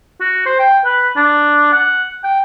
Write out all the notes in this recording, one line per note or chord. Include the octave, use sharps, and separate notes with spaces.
F#4
C5
G5
B4
D4
F#5
G5